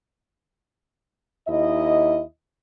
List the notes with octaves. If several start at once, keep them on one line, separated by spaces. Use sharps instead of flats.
D#2 E4 D#5